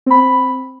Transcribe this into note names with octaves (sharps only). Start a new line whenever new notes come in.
C4 B5